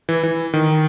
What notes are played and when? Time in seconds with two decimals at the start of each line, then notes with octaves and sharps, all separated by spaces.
0.09 E3
0.23 E3
0.54 D#3